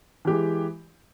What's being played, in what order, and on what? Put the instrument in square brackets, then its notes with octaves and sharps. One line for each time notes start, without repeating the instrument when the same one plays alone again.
[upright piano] E3
G4
G#3